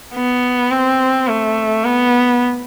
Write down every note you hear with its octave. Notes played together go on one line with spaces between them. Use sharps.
B3
C4
A3
B3